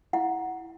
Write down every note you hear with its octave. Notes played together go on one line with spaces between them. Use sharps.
E4 F#5